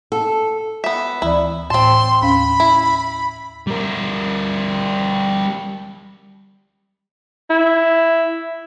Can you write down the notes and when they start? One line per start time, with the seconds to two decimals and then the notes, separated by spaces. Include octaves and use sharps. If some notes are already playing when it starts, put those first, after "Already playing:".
0.12 A4
0.84 B3 E5
1.22 D2 E3 E4 D5
1.70 A2 C4 A5 C6
2.22 D#2 C#4 F5 B5
2.60 E4
3.67 G3 A#4
7.50 E4